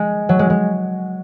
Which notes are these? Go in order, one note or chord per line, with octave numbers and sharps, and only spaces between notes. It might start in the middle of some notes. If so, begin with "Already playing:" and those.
Already playing: G#3
F#3
G#3
G#3